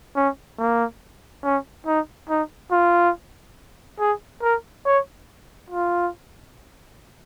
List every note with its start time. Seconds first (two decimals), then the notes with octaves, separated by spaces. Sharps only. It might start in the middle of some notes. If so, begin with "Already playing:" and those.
0.16 C#4
0.59 A#3
1.44 C#4
1.87 D#4
2.30 D#4
2.72 F4
3.99 G#4
4.42 A#4
4.86 C#5
5.71 F4